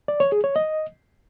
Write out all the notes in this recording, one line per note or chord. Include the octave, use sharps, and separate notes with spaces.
D5
C#5
G#4
C#5
D#5